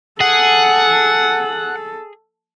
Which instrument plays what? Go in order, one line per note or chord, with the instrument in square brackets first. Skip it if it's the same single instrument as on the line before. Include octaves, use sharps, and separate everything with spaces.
[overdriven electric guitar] G#4 [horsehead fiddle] A4 [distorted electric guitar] F#5